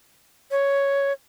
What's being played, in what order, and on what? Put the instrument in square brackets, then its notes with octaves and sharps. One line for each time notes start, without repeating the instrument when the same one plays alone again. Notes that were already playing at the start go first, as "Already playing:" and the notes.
[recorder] C#5